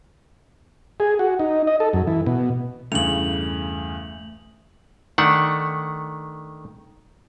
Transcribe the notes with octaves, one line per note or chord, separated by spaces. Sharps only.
G#4
F#4
D#4
D#5
A4
F#2
E3
B2
E2 G2 C#3 A3 F7 F#7
D#3 A3 D4 F#5